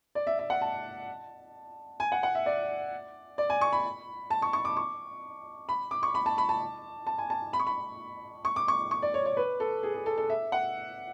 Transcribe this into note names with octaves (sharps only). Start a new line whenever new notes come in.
D5
E5
E5
F#5
A5
G#5
F#5
F#5
E5
D5
D5
G#5
C#6
B5
A5
C#6
C#6
D6
C#6
B5
D6
C#6
B5
A5
B5
A5
A5
G#5
A5
B5
C#6
B5
C#6
D6
C#6
C#6
D5
C#5
C#5
B4
A4
G#4
G#4
A4
A4
E5
F#5